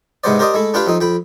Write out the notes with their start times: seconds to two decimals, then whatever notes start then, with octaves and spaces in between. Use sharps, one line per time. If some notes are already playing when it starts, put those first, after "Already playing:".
0.24 G#2 C3 G#3 B3 C5 D5
0.39 G4 A#4 C5 D5 D#5
0.54 G#3 A3 E4
0.74 D4 F4 G4 B4 F5 G5
0.87 F2 C4 D#4
1.01 F2 G5 B5